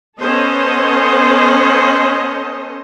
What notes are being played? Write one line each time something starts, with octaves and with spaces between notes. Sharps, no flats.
B3 C#4 A4 C5 D#5